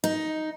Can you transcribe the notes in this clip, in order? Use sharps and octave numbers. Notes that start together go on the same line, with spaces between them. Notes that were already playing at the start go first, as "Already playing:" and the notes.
D#4